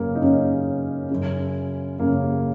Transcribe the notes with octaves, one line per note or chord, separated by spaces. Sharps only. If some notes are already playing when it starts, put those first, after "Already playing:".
Already playing: F#2 C#3 A#3 C#4
D#4
F#2 C#3 C#4
F#2 C#3
F#2 C#3 A#3